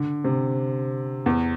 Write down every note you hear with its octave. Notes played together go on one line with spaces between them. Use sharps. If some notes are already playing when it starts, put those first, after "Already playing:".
Already playing: D3
C3
E2